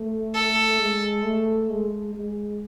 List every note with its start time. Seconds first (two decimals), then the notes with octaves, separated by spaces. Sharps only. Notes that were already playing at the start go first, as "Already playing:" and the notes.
Already playing: A3
0.35 A4
0.80 G#3
1.24 A3
1.70 G#3
2.14 G#3